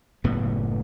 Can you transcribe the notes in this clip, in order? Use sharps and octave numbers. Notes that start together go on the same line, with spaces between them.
F#1 A2 B3